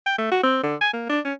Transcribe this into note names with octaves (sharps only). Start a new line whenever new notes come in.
G5
A3
F#4
C4
D3
G#5
A#3
D4
C#4